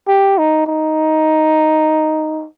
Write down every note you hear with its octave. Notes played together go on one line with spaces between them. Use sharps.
G4
D#4
D#4